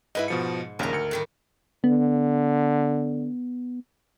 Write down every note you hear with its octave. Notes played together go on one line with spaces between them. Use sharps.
G#2 E4 B4 D#5 G#5 B5
B2 F3 C#7
A#1 D#2 C#3 A#4 A#5
D2 C#7
A2 D#3 G3
D3 B3